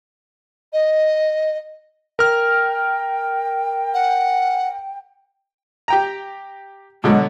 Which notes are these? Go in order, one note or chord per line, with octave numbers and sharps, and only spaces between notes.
D#5
A#4 G5 F6
F#5
G4 G5 A#5
B2 D3 F#3 G#3